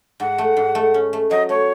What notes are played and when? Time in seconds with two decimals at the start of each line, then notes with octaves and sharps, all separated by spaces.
0.20 G#2 F#5
0.38 A3
0.57 G#2
0.75 A3
0.94 C#4
1.13 A3
1.30 F#3 D#5
1.49 A3 C#5